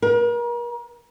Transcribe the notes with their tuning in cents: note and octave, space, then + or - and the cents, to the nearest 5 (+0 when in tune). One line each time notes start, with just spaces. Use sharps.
A#4 +40